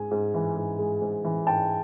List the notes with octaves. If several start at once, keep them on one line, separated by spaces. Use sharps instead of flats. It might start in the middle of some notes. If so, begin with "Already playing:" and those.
Already playing: G#2 G#3 G#5
G#2
E3
G#2
G#3
G#2
E3
G#2 G5 A5